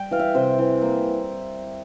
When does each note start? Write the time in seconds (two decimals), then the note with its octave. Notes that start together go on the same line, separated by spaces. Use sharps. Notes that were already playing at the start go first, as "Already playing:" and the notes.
Already playing: G3 G5
0.11 E3 F5
0.19 E5
0.35 C3 C5
0.59 E3
0.82 A#3